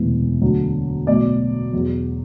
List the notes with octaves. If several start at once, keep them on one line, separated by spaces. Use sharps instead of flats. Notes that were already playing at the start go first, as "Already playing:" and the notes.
Already playing: E1 D2 C3 E3
D2 D3 F#3
B1 A2 F#3 D5
E2 B2 F#3